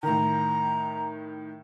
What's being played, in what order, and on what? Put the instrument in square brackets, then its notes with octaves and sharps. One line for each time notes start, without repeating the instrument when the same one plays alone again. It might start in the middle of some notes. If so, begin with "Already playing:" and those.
[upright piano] A2 D#3 [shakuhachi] A#5